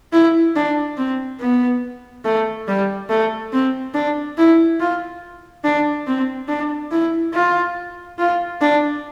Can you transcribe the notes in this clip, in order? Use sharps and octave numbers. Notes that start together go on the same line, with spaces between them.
E4
D4
C4
B3
A3
G3
A3
C4
D4
E4
F4
D4
C4
D4
E4
F4
F4
D4